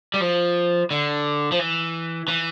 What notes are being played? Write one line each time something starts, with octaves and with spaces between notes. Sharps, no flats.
G3
F3
D3
F3
E3
E3